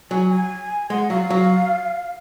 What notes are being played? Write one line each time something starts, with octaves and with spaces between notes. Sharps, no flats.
F#3 G#5
G#5
G#3 F#5
F#3 F5
F#3